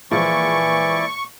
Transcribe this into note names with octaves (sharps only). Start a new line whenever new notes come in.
A#2 E3 F3 G#3 E4 D5 C#6